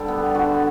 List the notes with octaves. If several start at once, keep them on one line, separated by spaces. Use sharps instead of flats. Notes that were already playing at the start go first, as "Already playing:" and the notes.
Already playing: D3 G3 G4 A4
B3
D3 F#4